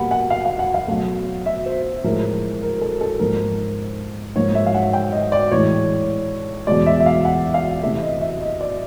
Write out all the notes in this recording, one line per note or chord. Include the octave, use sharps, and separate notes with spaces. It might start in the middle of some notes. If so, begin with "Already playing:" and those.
Already playing: B2 G3 A#3 F#5 B5
F#5
F5
F5
F#5
F5
B2 F#3 A3
E5
C5
A2 F3 G#3 A#4
A#4
A4
A4
G#2 F3 A#3 A#4
G#2 F3 A#3 C#5
E5
F5
F#5
G5
D#5
D5
A2 E3 G#3 C#5
E2 B2 G#3 D5
E5
E5
F5
F#5
F5
C3 E3 A3 E5
D#5
E5
D#5
D5